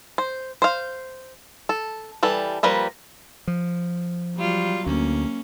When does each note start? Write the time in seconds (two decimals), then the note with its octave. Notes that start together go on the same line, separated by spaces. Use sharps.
0.18 C5
0.62 C5 F5
1.69 A4
2.23 E3 G3 A4
2.63 F3 G3 A#3 B4
3.47 F3
4.36 F#3 G3 F4
4.87 D2 A#3 C#4